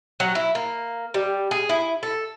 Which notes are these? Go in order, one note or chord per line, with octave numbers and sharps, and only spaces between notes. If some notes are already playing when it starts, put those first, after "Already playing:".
F#3
E4
A#3
G3
G#4
E4
A4